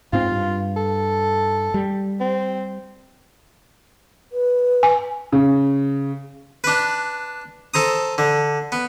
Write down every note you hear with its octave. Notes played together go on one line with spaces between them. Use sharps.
G#2 C4 F4
G2
A4
G3
C4
B4
G#5
C#3
D4 B4
A4 C5 A#5 D#6
D3
B3